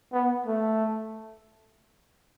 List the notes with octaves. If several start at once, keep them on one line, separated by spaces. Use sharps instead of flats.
B3
A3